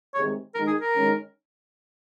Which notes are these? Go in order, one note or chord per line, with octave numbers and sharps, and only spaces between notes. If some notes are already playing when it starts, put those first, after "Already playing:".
C3 D#3 G#3 C#5
D#3 G#3 D#4 A#4
G#4
A#4
D#3 G#3 C#4